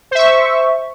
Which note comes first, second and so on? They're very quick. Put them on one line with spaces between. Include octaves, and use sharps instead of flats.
C5 E5 C#6